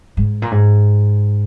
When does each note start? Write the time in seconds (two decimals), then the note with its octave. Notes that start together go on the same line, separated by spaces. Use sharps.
0.17 G#2
0.42 A#2
0.51 G#2